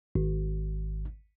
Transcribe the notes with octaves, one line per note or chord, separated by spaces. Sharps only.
G#1